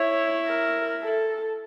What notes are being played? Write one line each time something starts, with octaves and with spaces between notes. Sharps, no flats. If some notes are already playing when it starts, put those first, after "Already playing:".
Already playing: E4 C#5
A#4
A4